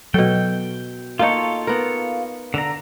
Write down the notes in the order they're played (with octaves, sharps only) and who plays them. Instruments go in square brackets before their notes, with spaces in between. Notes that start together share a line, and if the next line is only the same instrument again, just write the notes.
[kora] B2 A4 [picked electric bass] F#3 [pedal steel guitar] G5
[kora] A#3 D#4 [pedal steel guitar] F4 A4 C#5
[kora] B3 A#4
[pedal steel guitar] D3 A#5